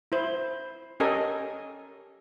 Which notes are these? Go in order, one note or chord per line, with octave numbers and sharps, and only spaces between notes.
E4 C5
C#4 G4 A4 A#4 D#5 G#5